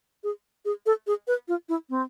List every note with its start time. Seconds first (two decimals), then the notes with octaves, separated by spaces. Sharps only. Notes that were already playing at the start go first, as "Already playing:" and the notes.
0.24 G#4
0.65 G#4
0.86 A4
1.07 G#4
1.27 B4
1.48 F4
1.69 E4
1.90 C4